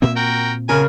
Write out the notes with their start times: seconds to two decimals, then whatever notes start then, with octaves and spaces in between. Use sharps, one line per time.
0.02 A#2 A#3 C4 E5
0.16 F#4 A#4 G5
0.69 C#3 A#4 G#5